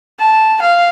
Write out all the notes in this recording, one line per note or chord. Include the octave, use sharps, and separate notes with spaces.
A5
F5